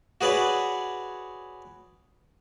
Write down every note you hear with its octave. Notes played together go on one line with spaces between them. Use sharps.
F#4 G#4 B4 C#5 D5